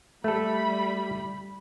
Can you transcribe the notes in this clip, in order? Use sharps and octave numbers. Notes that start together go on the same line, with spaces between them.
G3 A3 A4 B5